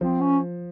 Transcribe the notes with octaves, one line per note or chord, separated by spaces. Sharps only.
F3 C4
C#4